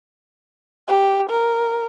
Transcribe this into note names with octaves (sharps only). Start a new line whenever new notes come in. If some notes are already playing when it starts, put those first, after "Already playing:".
G4
A#4